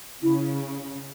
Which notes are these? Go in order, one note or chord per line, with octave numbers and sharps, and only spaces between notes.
C#3 E4